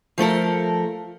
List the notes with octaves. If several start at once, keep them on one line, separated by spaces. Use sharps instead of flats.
F3 A3 A4 A#4